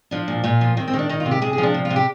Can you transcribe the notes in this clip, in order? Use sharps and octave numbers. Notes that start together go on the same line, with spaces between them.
F3 D4
A#2
A#2 F4
F3
D#3 C4
C4
D#3
D4
D#3 D#4
F4
C3
G4
C3 G#4
G#4
F3
D4
C3
F4
C3
G4